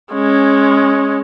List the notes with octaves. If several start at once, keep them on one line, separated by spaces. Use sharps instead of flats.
G#3 C#4